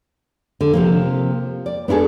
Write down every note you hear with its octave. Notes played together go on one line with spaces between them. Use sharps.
D3
C3 F3 A#3
D5
B3 D4 E4 G#4 A4